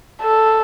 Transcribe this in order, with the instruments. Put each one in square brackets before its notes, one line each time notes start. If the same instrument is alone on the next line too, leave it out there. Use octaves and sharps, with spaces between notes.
[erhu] A4